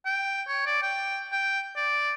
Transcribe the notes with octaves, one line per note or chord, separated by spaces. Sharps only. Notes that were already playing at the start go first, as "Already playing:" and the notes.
G5
C#5
D5
G5
G5
D5